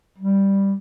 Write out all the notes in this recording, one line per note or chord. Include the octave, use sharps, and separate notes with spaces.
G3